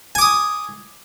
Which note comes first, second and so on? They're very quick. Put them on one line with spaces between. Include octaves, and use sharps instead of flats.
G#5 D6 D#6